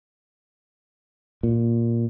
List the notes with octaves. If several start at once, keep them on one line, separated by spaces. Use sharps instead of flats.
A#2